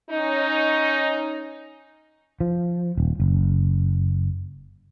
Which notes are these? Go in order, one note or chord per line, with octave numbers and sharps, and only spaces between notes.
C#4 D#4
F3
D#1
F#1